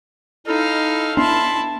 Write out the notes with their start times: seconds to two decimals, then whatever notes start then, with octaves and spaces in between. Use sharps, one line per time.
0.47 D#4 E4 A4 F5 F6
1.17 B3 D4 E4 A5 C6